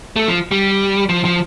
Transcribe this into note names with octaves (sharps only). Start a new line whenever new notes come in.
A3
F3
G3
F3
F3